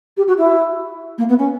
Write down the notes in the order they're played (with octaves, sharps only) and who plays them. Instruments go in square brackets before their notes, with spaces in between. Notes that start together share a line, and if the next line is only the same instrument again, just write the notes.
[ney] G4
F#4
E4
A#3
B3
C#4